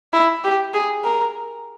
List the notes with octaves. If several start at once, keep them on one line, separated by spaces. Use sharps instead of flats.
E4
G4
G#4
A#4